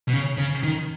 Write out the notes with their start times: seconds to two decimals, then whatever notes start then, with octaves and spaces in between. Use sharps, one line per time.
0.08 B2
0.13 C#3
0.38 C#3
0.63 D#3